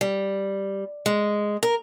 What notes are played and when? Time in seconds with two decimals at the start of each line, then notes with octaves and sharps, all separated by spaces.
0.01 G3
1.06 G#3
1.63 A#4